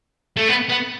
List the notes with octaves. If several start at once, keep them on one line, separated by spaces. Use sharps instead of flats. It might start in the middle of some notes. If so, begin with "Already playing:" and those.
A3
B3
B3